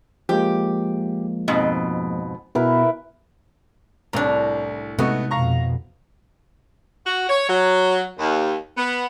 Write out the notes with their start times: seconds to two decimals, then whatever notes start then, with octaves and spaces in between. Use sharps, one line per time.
0.29 F3 G#3 A#3 G4
1.48 F2 G#2 B2
2.55 B2 B3 E4 A#4 B4
4.13 C2 A2 D4 A#5
4.99 C3 G#3 A3 B3 D#4 F#4
5.31 F2 B2 F5 A#5 C#6
7.05 F#4
7.29 C#5
7.49 F#3
8.19 D#2
8.77 B3